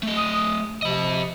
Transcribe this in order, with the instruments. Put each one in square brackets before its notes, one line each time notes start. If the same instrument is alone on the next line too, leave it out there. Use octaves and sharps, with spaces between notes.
[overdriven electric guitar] A3 D#5
[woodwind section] D#6
[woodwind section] C3 F3 [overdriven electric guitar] D#5 B5